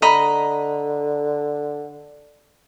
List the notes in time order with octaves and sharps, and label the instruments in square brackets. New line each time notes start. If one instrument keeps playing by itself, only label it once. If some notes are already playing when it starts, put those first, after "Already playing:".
[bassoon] D3 [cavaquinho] D#5 A#5 B5